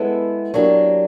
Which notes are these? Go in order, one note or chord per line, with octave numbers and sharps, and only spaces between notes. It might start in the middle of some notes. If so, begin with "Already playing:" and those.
Already playing: G#3 B3 E4 A4
F#3 A#3 D4 G4